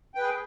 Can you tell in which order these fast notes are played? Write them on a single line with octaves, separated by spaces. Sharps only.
G5 B4 G#4